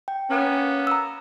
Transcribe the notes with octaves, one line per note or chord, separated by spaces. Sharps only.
G5
A#3 B3 C#4
A#5 E6